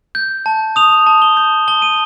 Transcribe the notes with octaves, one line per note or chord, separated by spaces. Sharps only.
G6
A5
D#6 F7
A5
G7
G6
A5 G7
D#7